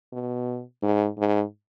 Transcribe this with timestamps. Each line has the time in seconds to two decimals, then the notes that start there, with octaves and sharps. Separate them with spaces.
0.13 B2
0.82 G#2
1.18 G#2